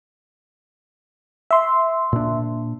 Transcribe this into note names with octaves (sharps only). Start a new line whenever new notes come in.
E5 C6
A#2 D4